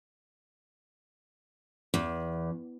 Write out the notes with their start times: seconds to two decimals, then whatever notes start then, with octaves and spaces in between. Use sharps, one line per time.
1.94 E2